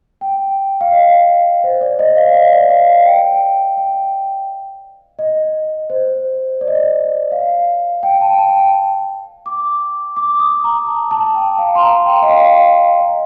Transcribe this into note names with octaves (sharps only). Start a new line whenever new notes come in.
G5
F5
D#5
C5
D5
D#5
F5
D#5
D5
F5
F5
G5
G5
D#5
C5
D5
D#5
D5
F5
G5
A5
A5
G5
D6
D6
D#6
A#5
A5
A5
G5
F5
C6
A#5
G5
D#5
F5
D#5